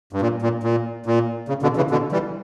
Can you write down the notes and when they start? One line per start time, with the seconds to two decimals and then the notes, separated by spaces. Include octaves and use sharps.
0.13 G2
0.22 A#2
0.42 A#2
0.63 A#2
1.06 A#2
1.48 C#3
1.62 B2 D3
1.77 C#3 E3
1.91 B2 D3
2.12 E3 G3